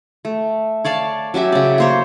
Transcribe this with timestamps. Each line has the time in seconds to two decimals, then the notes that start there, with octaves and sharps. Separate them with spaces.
0.25 A3
0.84 C#5 D5 F5 A5
1.34 F#3 C#4 G4 E5
1.52 C#3 D5
1.78 A#3 C5 C#5